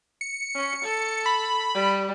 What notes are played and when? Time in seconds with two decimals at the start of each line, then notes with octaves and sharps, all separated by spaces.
0.21 C#7
0.55 C#4
0.84 A4
1.26 B5
1.74 G3